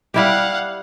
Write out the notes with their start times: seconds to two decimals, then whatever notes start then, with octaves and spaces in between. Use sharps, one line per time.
0.14 G3 E4 G4 F5 F#5